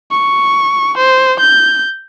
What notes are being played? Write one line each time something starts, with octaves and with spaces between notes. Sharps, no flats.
C#6
C5
G6